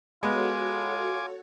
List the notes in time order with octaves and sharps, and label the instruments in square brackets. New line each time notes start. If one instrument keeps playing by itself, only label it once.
[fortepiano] G#3 B3 [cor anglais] F4 [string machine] F#4 A4 C#5 [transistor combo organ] G#5 D6